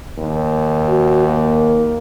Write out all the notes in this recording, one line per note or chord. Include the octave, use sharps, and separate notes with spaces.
D#2
F#4
A#3